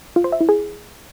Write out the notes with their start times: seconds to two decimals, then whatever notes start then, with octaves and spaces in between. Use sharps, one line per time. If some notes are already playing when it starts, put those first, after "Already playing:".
0.16 F4
0.24 C5
0.32 E5
0.41 E4
0.49 G#4